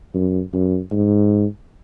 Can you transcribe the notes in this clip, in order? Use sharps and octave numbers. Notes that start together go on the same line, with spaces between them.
F#2
F#2
G#2